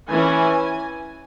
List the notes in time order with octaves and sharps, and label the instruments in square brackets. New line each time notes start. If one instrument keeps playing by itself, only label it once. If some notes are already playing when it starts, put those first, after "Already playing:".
[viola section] E3 C#4 G#5